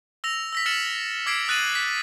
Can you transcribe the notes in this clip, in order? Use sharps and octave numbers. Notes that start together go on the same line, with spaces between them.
E6 A#6 F7
E6 A#6 B6
F6 A6 C#7 E7 F#7
D6 E6 G#6 B6 C7 D7
D#6 F#6 A6 D#7 F#7
B6